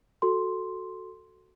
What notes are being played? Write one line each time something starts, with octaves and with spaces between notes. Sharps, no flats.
F#4 A4 C6